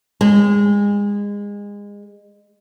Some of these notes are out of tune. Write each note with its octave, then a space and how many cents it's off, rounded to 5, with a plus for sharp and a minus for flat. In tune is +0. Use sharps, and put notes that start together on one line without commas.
G#3 -30